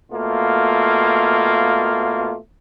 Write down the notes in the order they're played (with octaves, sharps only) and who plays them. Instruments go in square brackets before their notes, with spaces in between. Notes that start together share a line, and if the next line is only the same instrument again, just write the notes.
[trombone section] B2 A3 A#3 F4